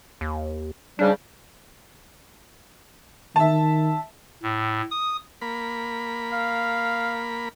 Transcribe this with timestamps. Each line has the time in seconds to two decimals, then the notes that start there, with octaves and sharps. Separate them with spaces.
0.21 D#2
0.99 G#2 C#3 G3 D4
3.36 D#3 E5 A5
4.43 A2
4.91 D#6
5.41 A#3 B5
6.33 F5